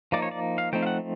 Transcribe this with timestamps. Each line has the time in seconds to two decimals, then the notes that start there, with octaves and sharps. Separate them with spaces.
0.12 F3 A#3 D#4 D5
0.22 C#5
0.31 D5
0.58 F5
0.73 F3 A3 C4 D#4 G5
0.82 F5
0.87 F#5